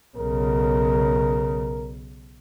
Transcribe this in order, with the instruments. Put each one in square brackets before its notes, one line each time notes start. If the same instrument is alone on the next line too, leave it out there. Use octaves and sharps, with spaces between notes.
[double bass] B1 C#3 [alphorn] A#4